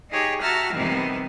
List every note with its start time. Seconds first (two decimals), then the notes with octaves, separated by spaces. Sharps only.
0.10 D#4 G4 G#4 C#5
0.41 F#4 E5 G5 A5 A#5 F6
0.72 C3 D#3 E3 G3 B3